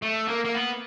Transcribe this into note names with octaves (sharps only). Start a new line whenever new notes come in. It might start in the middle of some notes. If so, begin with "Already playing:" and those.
A3
A#3
A#3
B3